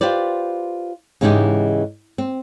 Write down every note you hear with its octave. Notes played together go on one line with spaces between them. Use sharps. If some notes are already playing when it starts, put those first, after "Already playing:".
F4 G4 B4 C5 D5
G#2 C#3 E3 G#3 D#4 G4
C4